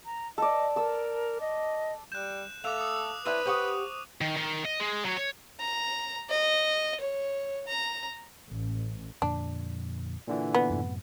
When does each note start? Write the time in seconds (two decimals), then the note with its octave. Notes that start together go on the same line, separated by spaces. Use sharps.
0.06 A#5
0.38 A4 D5 D#5
0.76 A4 A#4 E6
1.41 D#5
2.12 G3 F#6 G6 E7
2.64 A3 A4 F5 D6 E6 F#6 F7
2.81 D#6
3.26 C4 D4 E4 B4 D#7
3.45 G4 C5 F#5 C#6 D#6
4.21 D#3
4.37 D#3
4.65 D#5
4.80 G#3
5.05 F#3 C#5
5.18 C#5
5.60 A#5
6.30 D#5
7.00 C#5
7.67 A#5
8.49 A1
9.22 F2 A#2 D3 D4
10.27 A#2 D3 E3
10.54 B3
10.70 F#2 A2 C3